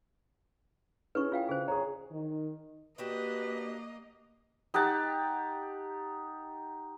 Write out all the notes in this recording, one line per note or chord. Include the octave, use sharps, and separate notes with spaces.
C#4 E4 G#4 B4 C#6
F4 F5 G5
C#3 G#4 C5
G#4 C#5 A#5
D#3
A#3 D4 F#4 G4 B4 D#5
D#4 G4 F#5 A5